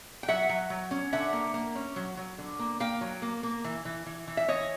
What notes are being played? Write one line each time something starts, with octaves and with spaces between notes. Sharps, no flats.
G5
F#3 E5 F#5
F#3
F#3
C#4
D3 E5 F#5
A#3
A#3
C#4
F#3
F#3
D3
A#3
A#3 F5 G5
F#3
A#3
A#3
E3
E3
E3
E3
E5
E3 C#5 D#5